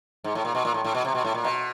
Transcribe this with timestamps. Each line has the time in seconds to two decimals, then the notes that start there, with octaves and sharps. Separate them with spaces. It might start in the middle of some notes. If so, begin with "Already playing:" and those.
0.24 G#2
0.35 A2
0.45 A#2
0.55 B2
0.65 A#2
0.74 A2
0.84 A2
0.95 B2
1.05 C3
1.15 B2
1.25 A2
1.34 A#2
1.45 B2